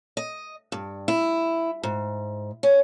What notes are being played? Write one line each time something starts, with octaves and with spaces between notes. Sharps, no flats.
D#5
G2
E4
G#2
C#4